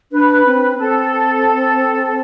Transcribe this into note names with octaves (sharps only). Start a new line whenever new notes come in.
D4 B4
C4
C4 A4
A4